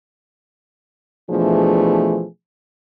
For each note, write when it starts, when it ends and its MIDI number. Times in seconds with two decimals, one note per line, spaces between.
1.30 2.25 47
1.30 2.25 52
1.30 2.25 53
1.30 2.25 57
1.30 2.25 62
1.30 2.25 68